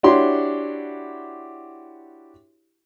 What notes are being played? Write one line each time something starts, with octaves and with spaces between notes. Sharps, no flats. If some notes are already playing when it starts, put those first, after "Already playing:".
D4 E4 F#4 G4 C#5 C6